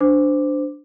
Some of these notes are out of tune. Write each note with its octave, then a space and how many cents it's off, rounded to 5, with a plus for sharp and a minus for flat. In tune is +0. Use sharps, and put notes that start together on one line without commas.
D4 +0 C5 -20 D6 +0